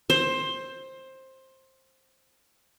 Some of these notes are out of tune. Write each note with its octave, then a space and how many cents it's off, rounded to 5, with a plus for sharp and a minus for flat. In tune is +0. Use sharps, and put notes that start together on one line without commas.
C5 +15